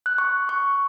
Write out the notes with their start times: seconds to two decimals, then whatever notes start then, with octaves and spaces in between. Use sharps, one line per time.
0.06 F#6
0.18 C#6
0.49 C#6